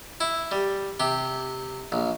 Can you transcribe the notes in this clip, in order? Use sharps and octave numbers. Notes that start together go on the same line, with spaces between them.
E4
G3
C3 G4
A#1